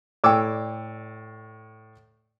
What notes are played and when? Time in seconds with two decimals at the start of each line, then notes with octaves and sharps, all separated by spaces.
0.24 A2 D5 G5 D6 E6